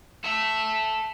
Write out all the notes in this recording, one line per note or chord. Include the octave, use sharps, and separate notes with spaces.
A4 E5